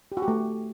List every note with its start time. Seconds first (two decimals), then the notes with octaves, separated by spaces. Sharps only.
0.12 G4
0.17 F#4
0.22 G4
0.28 A3